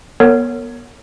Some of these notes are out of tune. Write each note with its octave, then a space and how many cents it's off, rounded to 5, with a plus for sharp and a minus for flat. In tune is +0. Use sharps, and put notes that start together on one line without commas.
B3 -30 A#4 -30 C#5 +0